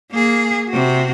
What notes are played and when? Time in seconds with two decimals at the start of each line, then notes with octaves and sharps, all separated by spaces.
0.12 A#3 G#4
0.70 C3 F#4